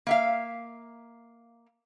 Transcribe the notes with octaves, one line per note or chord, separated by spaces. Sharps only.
A#3 E5 F5